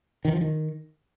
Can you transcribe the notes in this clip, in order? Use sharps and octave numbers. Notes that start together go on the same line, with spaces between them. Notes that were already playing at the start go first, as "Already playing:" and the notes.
D#3
F3
D#3